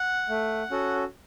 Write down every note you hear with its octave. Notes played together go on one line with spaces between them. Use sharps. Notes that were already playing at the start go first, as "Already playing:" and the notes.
Already playing: F#5
A3
C#4 F#4 A4